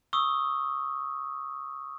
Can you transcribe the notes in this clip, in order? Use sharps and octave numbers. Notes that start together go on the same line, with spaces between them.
C#6 D#6 E6